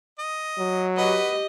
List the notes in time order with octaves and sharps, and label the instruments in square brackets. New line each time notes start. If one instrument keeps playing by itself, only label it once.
[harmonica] D#5
[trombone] F#3
[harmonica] F#4 B4 [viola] G4 D#5